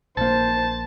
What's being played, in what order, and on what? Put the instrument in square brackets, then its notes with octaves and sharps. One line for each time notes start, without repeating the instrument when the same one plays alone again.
[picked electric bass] A#1 A#3 [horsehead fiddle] C5 [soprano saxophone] A5